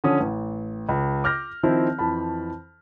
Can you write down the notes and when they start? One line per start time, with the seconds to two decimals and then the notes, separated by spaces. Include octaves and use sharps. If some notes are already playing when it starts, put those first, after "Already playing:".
0.04 D3 F3 C#4 D#6
0.20 A1
0.89 C#2
1.24 D6 F6 G6 A#6
1.63 D#3 F3 C4 E4
1.99 F2 E3 A5 B5